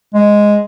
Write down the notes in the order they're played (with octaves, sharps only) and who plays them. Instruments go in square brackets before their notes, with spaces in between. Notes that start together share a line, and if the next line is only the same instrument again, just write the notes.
[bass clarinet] G#3